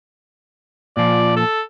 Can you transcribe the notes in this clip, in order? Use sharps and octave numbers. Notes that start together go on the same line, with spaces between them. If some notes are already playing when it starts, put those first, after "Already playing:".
A#2 F3 D5
A4